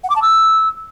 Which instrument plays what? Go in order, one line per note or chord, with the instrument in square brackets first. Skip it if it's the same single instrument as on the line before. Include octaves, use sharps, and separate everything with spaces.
[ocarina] F#5
D6
A5
E6